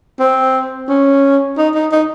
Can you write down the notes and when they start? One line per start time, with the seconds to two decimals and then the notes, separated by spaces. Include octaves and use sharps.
0.19 C4
0.88 C#4
1.57 D#4
1.75 D#4
1.92 D#4